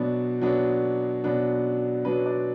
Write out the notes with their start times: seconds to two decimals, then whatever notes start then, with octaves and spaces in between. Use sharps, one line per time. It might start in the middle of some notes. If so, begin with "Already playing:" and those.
Already playing: B2 F#3 B3 D4 D5
0.41 B2 F#3 B3 D4
1.24 B2 F#3 B3 D4
2.05 B2 F#3 B3 D4 B4
2.26 D5